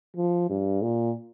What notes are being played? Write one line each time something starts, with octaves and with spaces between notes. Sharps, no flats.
F3
G2
A#2